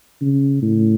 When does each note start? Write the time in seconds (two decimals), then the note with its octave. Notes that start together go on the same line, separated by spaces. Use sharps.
0.21 C#3
0.62 A2